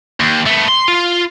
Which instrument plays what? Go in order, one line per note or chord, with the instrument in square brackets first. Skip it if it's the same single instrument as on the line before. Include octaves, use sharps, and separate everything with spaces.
[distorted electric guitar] D#2
A3 B3
C6
F4